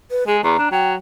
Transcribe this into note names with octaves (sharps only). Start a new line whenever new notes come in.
B4
G#3 G#4
E2 A#5
D4
F#3 G5